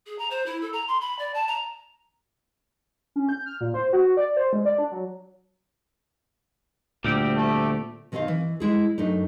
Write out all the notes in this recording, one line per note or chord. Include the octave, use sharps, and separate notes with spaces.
G#4
A#5
C5
E4
A4
A#5
C6
B5
D5
A5
A#5
C#4
G6
F6
A#2
C5
F#4
D5
C5
G#3
D5
D4
F#3
D2 A#2 G3 C4 G4
A3
B2 D#3 C4 A#4 D#5 F5
E3
G#3 E4 G#4
F#2 A3 D4 D#4